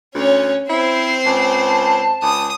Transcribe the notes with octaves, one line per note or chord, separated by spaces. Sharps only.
D2 C#4 C#5
C4 E4 C5
C#2 A5
C#2 D#6